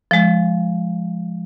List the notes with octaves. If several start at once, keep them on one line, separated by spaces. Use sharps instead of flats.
F3 G#3